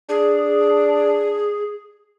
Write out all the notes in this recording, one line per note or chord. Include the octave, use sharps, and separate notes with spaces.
D4 G#4